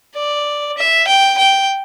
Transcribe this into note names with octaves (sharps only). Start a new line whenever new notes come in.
D5
E5
G5
G5